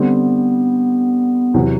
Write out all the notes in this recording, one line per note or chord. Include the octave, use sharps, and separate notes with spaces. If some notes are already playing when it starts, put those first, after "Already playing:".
Already playing: D3 G3 B3 C4
E2 C3 F#3